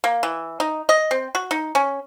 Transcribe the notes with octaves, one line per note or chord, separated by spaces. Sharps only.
A#3
E3
D#4
D#5
C4
F#4
D#4
C#4